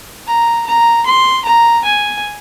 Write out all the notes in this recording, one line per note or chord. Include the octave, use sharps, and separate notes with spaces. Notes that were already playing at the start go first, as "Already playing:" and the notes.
A#5
A#5
C6
A#5
G#5